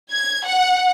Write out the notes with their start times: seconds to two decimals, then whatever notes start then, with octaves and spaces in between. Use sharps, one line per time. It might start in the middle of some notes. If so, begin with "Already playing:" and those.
0.12 G#6
0.45 F#5